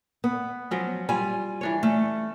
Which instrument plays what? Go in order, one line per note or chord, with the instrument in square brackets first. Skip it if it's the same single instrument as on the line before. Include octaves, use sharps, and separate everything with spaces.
[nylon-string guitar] B3
[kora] F3 F#3 C#4
[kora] G3 [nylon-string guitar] F4 G#5
[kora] E3 D4 C#5
[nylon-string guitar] A3 [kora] C#4